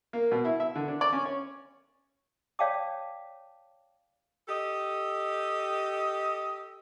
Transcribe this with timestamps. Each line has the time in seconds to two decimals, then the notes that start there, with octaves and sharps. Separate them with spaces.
0.13 A#3
0.32 B2
0.45 E4
0.60 E5
0.75 D3
0.88 D4
1.01 D5
1.13 C#4
1.26 C#5
2.59 C#5 D5 F5 G5 A5 D6
4.48 G4 A4 D#5